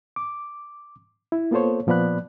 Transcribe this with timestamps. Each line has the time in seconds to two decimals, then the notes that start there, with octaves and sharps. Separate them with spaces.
0.16 D6
1.32 E4
1.51 A#3 B3 F4 A4 C5 C#5
1.87 A#2 F3 B3 D5 B5 F#6